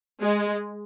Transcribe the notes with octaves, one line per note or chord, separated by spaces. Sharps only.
G#3